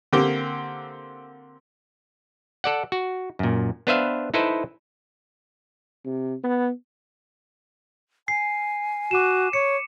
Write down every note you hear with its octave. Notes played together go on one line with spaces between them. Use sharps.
D3 A#3 C4 G4
A4 D5 F#5
F#4
F#2 A#2
B3 D4 B4 C5 E5 F5
D#4 E4 A4 B4 C5
C3
B3
G#5 C7
F#4 D6 D#7 E7
C#5 C#7